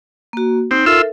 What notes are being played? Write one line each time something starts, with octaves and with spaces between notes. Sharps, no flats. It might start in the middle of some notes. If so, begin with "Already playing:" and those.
A#3 F#4
C4 D#4
F4 A4 A#4 E5 E6